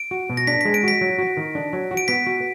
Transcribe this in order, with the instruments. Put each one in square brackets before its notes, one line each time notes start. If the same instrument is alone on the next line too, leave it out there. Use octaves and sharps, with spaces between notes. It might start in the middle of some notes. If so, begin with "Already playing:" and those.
Already playing: [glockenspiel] D7
[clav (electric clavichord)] F#4
B2
[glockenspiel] A#6
[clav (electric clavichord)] D4 [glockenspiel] B6
[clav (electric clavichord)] G#3 [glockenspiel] B6
[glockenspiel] D7
[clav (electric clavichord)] F#4 [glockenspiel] B6
[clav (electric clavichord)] F#3
F#4
D#3
D4
F#3
F#4
[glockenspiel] D7
[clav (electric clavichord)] B3 [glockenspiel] B6
[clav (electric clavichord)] F#4